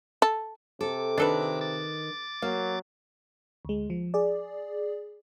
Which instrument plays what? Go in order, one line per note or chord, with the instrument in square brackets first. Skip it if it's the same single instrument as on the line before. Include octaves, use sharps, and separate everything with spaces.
[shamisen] A4
[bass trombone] C3 [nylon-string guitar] A4 [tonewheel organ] D6
[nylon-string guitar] D#3 [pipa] D4 A4 B4
[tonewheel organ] D6 A6
[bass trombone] F#3 [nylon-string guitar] A#3 [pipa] F5
[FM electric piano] D2 G#3
F3
G#4 D5